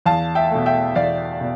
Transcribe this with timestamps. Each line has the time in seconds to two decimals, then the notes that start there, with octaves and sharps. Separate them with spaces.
0.06 E2 F5 A5
0.35 E5 G5
0.51 B2 A3
0.66 E5 G5
0.95 E2 D5 F5
1.41 B2